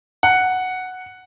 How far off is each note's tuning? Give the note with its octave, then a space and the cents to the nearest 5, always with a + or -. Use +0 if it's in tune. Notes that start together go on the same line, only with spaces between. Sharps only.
F#5 +0